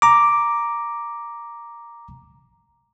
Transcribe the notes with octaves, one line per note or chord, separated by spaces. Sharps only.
A#5 D6